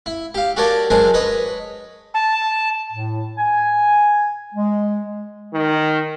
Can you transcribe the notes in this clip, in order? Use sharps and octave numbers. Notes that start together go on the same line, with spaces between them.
E4
G4 F5
F#4 G4 A4 A#4 C#5 D5
F#3 G#3 D4 A#4 C5 G#5
B4 C#5 D#5
A5
A2
G#5
G#3
D#3